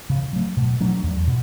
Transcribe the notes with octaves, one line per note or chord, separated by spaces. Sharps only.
C#3
F#3 A3
B2
F#3 A3 D4
E2
B2